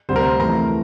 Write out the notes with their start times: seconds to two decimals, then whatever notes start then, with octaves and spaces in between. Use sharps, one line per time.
0.09 D2 C3 G3 C5
0.16 A#4
0.23 C5
0.39 F2 E3 A3 A#5